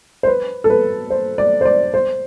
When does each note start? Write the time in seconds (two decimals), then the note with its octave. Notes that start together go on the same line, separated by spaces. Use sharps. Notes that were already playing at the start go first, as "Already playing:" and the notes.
0.23 C5
0.27 B4
0.64 A4
0.70 B4
1.10 C5
1.38 D5
1.61 C5
1.65 D5
1.94 C5